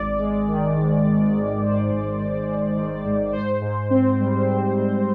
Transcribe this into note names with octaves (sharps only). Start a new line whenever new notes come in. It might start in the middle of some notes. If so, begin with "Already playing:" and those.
Already playing: G#1 D5
G#3
D#3
G#2
G#1
G#3
D#3 C5
G#2
G#1
G#3
D#3
G#2
G#2 C5
G#2
C4
G3
G#2
G#2